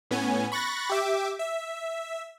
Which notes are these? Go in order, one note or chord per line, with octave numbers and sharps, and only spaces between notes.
A2 B3 C#4 G#5
B5 C#6 F#6 A6 A#6
G4 E5 D6
E5